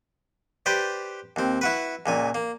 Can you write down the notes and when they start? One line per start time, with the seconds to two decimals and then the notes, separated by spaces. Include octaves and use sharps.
0.66 G4 B4 C5 D5
1.36 D#2 C4
1.61 E4 F#4 B4
2.06 C#2 A#2 G#5
2.35 A#3